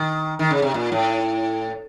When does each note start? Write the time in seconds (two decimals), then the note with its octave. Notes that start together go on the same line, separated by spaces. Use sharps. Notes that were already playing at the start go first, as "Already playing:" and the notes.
Already playing: D#3
0.39 D#3
0.51 C#3
0.62 C3
0.74 A#2
0.92 A2